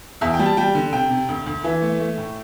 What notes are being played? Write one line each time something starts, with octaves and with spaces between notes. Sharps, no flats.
E2 E5
G5
G3
A5
G3 G5
D3
C3 G5
C3
D2
D2
E3 E5
A3
A3
A2